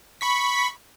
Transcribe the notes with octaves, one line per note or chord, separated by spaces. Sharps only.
B5 C#6 B6